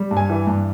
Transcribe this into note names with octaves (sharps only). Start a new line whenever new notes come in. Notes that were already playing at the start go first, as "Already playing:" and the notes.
Already playing: G3
G2
G#5
E3
G2